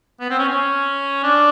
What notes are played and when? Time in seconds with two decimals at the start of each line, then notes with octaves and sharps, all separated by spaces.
0.20 B3
0.30 C4
0.38 C#4
0.49 C#4
1.23 D4